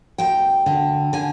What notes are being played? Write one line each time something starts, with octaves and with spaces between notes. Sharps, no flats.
D2 G5
D3
D3 G#5